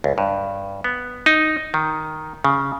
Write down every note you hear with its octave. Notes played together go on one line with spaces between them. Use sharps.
C#2
G2
B3
D#4
D#3
C#3